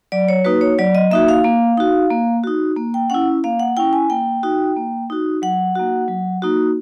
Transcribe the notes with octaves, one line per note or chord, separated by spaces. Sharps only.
F#3 D5
C#5
A#3 D#4 F#4 B4
C#5
F#3 D5
D#5
A#3 D#4 F#4 E5
F5
A#3
D#4 F#4
A#3
D#4 F#4
A#3
G5
C#4 E4 F#5
A#3 F5
F#5
C#4 E4 G5
G#5
A#3 G5
D#4 F#4
A#3
D#4 F#4
F#3 F#5
A#3 D#4 F#4
F#3
A#3 D#4 F#4